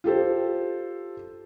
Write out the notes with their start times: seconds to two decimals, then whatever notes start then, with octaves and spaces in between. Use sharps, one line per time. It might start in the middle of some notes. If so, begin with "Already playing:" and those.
0.04 F4 G4 A4 C5